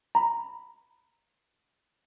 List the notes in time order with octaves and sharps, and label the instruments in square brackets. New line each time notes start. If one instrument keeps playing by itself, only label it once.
[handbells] A#5 B5